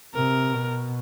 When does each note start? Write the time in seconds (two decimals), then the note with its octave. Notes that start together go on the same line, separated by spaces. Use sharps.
0.14 C3 A#4
0.52 B2